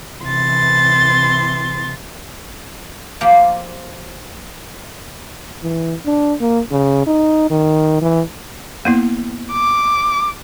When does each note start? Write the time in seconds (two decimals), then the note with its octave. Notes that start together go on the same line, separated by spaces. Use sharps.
0.23 C3 E3 C6 A6
3.21 F3 A#3 F4 G4 C5 F5
5.63 E3
6.06 D4
6.41 A#3
6.71 C#3
7.07 D#4
7.50 D#3
8.01 E3
8.85 A#3 B3 E4
9.52 D6